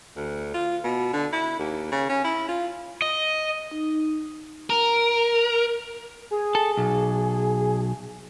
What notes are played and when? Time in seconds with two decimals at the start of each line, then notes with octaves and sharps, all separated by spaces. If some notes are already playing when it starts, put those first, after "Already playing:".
0.16 D2
0.54 F4
0.84 B2
1.13 D3
1.33 E4
1.59 D#2
1.92 C#3
2.09 C#4
2.24 E4
2.49 F4
3.02 D#5
3.71 D#4
4.70 A#4
6.31 G#4
6.55 A4
6.77 B1